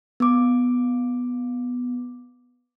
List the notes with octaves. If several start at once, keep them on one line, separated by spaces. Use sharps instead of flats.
B3 D6